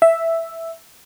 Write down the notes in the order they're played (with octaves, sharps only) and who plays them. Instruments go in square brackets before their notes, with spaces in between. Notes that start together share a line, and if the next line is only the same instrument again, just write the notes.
[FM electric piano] E5